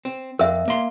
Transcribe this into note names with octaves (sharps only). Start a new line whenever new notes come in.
C4
F2 A#4 E5
A#3 C6